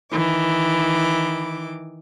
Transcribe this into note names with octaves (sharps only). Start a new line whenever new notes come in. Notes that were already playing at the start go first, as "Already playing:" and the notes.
D#3 E3 D6